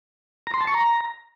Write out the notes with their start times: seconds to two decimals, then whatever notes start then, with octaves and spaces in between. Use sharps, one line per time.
0.47 A#5
0.54 C6
0.61 A5
0.67 C#6
0.74 A#5